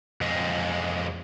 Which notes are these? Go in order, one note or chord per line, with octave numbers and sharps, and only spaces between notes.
F2 G#3